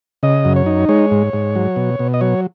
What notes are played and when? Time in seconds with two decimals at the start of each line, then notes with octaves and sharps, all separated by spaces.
0.23 C#3 D#5
0.45 F#2
0.56 C#5
0.66 D#4
0.89 G#3 C#5
1.11 G#2
1.33 G#2
1.55 F#3
1.76 B2
1.99 B2
2.14 D#5
2.21 F#3 C#5